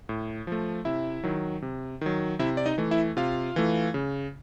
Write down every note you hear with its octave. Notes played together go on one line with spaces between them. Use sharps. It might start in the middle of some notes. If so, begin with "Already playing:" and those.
A2
F3 A3
C3 E4 E5
D#3 F#3
C3
D#3 F#3
C3 E4 E5
D5
D#4 D#5
E3 A3
E4 E5
C3 F4 F5
E3 A3
C#3